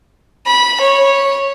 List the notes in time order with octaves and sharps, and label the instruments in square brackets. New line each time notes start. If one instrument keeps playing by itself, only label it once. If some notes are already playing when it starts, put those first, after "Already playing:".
[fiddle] B5
C#5